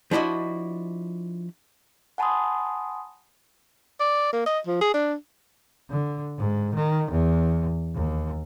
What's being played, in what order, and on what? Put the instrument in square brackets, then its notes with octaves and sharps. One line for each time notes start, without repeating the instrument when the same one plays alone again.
[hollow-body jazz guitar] F3 D4 E4 F#4 D#5
[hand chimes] F#5 G#5 A5 B5 C6 D#6
[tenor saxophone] D5
A#3
D#5
F3
G#4
D4
[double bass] D3
G#2
D#3
E2
D#2